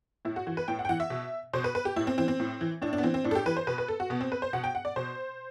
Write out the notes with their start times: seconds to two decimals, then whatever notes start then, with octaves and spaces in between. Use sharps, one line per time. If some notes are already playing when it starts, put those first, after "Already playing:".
0.25 A2 E4
0.36 F#4
0.47 E3 F#4
0.57 B4
0.68 A2 G5
0.79 F#5
0.85 G5
0.89 E3 F#5
1.00 E5
1.10 B2
1.53 B2 C5
1.64 B4
1.75 B4
1.85 G4
1.96 A2 E4
2.07 C4
2.18 E3 C4
2.28 C4
2.39 A2
2.61 E3
2.82 A2 D4
2.93 D4
2.98 B3
3.03 E3 C4
3.14 C4
3.24 A2 D4
3.31 A4
3.35 G4
3.46 E3 B4
3.57 C5
3.67 B2 B4
3.78 B4
3.88 A4
4.00 F#4
4.10 B2 B3
4.21 C4
4.32 B4
4.42 C5
4.53 B2 F#5
4.64 G5
4.75 F#5
4.85 D5
4.96 B2 C5